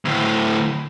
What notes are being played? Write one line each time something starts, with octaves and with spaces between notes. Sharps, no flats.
D2 A2